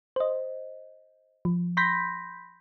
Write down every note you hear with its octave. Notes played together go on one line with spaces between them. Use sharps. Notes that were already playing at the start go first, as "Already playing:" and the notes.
C5 D#5
F3
B5 C6 G6 A#6 B6